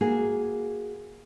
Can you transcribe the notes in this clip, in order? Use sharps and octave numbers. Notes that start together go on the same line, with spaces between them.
A#3 F#4 G#4